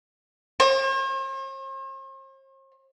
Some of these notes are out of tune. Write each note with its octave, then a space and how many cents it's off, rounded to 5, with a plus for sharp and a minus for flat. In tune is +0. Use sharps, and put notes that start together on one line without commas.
C5 +45